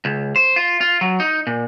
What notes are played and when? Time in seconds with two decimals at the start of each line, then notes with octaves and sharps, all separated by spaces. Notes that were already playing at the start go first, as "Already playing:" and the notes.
0.05 C#2
0.36 C5
0.56 F4
0.81 F4
1.01 F#3
1.20 D#4
1.47 A#2